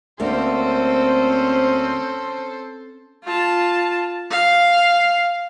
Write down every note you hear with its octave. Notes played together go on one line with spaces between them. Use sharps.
D2 A#3 C4 C#4 A4 C5
F4 A5
F5